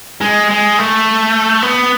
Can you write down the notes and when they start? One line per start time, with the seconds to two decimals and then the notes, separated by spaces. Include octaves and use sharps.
0.21 G#3
0.51 G#3
0.79 A3
1.62 B3